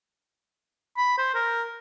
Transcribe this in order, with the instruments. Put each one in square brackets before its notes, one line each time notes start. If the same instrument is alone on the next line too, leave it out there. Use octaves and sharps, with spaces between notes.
[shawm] B5
C5
A#4